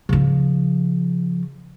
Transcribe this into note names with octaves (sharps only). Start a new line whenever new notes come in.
C#3 F3